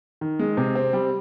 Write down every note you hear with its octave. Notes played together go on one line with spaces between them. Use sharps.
D#3
G#3
C3
C4
G3